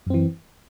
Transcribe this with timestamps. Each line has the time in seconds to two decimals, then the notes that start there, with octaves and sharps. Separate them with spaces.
0.07 F#2
0.10 C4
0.14 E3